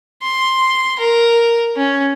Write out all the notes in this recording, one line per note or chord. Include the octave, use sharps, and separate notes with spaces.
C6
A#4
C#4